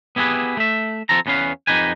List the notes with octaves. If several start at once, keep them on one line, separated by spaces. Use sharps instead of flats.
B3 E4 G4 G#4 B4
A3 E5
F3 C4 A4 A#5
E2 B3 C#4 B4 F5
F2 D#4 G4 B4 G#5